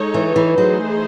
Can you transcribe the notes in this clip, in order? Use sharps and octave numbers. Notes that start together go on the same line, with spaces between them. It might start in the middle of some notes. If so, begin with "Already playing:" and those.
Already playing: G#3 D#4 A4 C#5
E3
E3
E3 F#3 A3 D#4 G#4 C5